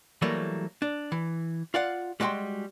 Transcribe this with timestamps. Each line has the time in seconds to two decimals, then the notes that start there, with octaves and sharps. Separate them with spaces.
0.22 E3 F#3 G3 A3 A#3
0.82 D4
1.12 E3
1.74 F4 D5 F5 F#5
2.20 G3 G#3 F#4 F5 G5 C6